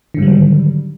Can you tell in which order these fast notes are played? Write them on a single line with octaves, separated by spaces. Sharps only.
D3 G#2 G3 F#3 D#3